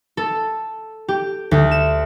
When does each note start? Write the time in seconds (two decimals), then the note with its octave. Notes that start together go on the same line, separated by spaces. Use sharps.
0.17 A4
1.08 G4
1.51 D2
1.71 E7